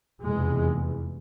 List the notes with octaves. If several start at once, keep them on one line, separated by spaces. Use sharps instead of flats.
F1 E2 B2 G#3